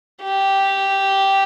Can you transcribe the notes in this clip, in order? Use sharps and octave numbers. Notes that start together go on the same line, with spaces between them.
G4